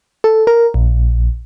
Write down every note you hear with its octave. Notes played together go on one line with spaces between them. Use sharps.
A4
A#4
A#1